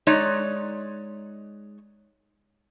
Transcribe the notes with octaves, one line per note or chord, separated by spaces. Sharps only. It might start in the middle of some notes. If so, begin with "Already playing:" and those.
G#3 D#4 C#5 D5